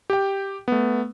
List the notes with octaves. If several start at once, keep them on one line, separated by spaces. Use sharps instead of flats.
G4 G5
A3 B3